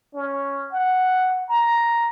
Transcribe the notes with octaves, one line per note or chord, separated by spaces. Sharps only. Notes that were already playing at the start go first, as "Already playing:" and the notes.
C#4
F#5
A#5